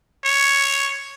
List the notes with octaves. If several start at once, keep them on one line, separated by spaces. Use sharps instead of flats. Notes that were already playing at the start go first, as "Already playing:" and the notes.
C#5